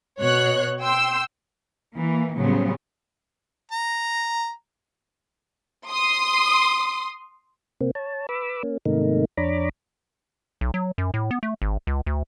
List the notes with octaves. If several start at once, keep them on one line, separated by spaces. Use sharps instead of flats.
B2 C#5 F#6
G5 C6 E6
E3 A#3
A2 C#3 F#3 G3 B3 C4
A#5
C6 D#6
C3 A#3 C4
C#5 A5
B4 B5 D6 E6
A#3 C#4
G#2 C3 D#3 A3 A#3 D#4
F2 D4 C#5 A#5 B5 D6
B1
F#3
F#2
A2
B3
A3
G#1
C#2
D2